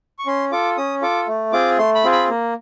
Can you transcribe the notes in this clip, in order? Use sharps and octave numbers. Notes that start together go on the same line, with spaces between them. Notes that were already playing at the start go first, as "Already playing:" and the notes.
C#6
C#4 C6
F4 A4 D6
C#4 D#6
F4 A4 D6
A3
C4 F4 G#4 D6
A3 C6
B5
C4 F4 G#4
B5
A#3